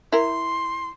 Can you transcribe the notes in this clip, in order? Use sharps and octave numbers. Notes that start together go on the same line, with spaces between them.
E4 A#4 C6